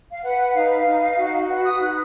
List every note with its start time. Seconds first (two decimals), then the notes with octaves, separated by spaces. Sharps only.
0.12 F5
0.23 B4 F#5
0.55 D#4 F5
0.86 D#4
1.17 F#4
1.49 B4 F#5
1.65 D#6
1.80 D#4 F#6